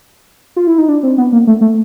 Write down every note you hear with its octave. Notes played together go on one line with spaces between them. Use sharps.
F4
E4
D#4
D4
C4
B3
A#3
A3
A3